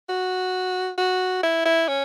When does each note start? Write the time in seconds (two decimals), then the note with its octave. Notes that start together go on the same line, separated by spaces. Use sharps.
0.09 F#4
0.98 F#4
1.43 E4
1.65 E4
1.88 C#4